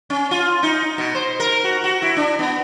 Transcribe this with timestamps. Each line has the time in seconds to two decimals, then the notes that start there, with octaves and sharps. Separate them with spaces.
0.10 C#4
0.31 F4
0.63 D#4
0.98 B2
1.15 C5
1.40 A#4
1.64 F#4
1.84 F#4
2.02 E4
2.17 D4
2.39 B3